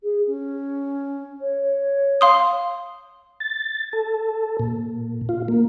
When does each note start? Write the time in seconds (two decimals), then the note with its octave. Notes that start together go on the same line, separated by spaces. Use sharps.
0.03 G#4
0.27 C#4
1.41 C#5
2.21 F5 C6 D#6
3.40 A6
3.93 A4
4.60 A#2
5.29 F4
5.48 A#3